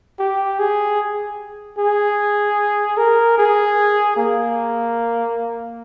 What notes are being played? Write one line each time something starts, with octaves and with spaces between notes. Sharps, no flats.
G4
G#4
G#4
A#4
G#4
A#3